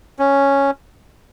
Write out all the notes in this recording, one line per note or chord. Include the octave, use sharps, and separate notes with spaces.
C#4